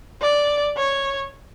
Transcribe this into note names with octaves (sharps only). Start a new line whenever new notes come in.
D5
C#5